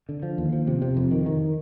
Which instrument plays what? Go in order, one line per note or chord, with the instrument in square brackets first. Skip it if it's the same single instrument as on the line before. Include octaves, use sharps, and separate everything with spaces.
[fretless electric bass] D3
F3
D#2
F3
C3
C3
F2
D#3
D#3